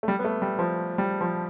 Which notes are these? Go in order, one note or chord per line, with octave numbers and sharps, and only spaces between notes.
A3
G3
B3
A3
G3
F3
G3
F3